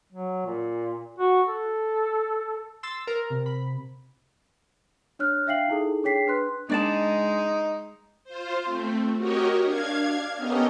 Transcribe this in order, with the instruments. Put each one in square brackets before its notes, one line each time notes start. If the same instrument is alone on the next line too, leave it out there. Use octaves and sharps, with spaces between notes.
[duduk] F#3
A#2
F#4
A4
[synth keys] C6 E6 A6
A#4
[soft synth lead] C3
[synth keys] B5
[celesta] D4 C#5 F6 F#6
D4 E5 F5 G5 C7 F#7
D#4 E4 G#4 A4
D4 G#4 C#5 G5 B6 C7
D4 B4 C6 F#6
[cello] G#3 [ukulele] D4 D5 A5 [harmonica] D#4
[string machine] F4 C5
A3 C4
F#4 G4 A#4 C#5 D#5
D4 F5 G#6
B3 C#4 G4 A4 A#4 D#5